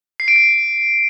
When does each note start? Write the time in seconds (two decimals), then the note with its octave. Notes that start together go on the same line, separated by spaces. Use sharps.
0.20 C7
0.28 D7
0.36 C7